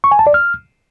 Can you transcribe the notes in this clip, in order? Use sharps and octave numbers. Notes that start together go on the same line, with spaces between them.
C#6
G#5
A5
D5
F6